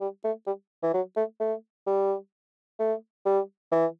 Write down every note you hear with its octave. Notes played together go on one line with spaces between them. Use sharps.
G3
A3
G3
E3
F#3
A3
A3
G3
A3
G3
E3